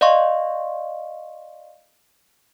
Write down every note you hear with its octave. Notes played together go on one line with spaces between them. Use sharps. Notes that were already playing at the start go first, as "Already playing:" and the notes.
D5 D#5 F5 C6 C#6